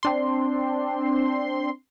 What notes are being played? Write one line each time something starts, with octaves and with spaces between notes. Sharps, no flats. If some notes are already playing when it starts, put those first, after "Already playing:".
C4 D4 C6